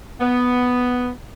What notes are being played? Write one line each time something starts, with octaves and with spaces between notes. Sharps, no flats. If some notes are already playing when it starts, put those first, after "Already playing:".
B3